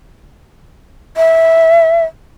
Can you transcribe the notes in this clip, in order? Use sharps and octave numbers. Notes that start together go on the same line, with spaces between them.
E5